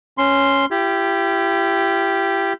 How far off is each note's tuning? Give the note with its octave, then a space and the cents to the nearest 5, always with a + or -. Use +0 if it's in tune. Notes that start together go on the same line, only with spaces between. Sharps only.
C#4 -5 C6 +0
E4 +40 G4 +0